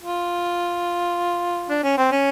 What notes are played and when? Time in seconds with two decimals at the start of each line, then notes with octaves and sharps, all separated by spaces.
0.01 F4
1.69 D4
1.83 C#4
1.97 C4
2.11 C#4